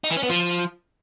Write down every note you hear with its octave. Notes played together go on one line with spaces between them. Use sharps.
D#4
E3
C#4
B3
F3